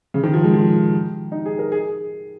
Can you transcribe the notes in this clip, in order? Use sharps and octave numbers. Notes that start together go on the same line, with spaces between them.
C#3
D#3
F3
G#3
F3
D#4
G#4
A#4
G#4